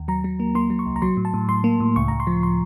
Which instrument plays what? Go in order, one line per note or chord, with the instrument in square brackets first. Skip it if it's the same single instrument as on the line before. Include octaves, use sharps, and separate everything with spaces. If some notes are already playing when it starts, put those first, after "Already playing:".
Already playing: [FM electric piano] D#2
F#3 A#5
F#3
A#3
A#3 C6
F#3
C#6
C2
A#5
F#3 C6
A2
A5
A2
A2 C6
A#3
A2
C#2 C#6
C#2 A#5
C6
F3
C6